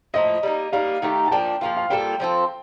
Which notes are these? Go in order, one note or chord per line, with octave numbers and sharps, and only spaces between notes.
A2 F3 A#3 D#5
G3 A#3 D#4
G3 A#3 D#4 F5
D#3 A3 D#4 G4
A5
F3 A#3 D4 G5
F3 A#3 F4 F5
F5
G3 A#3 F4 A4 G5
F3 C4 F4 A4